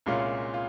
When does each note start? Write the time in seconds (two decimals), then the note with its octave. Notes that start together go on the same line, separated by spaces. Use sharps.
0.06 C2 A#2 G#3 C#4 F4
0.54 F4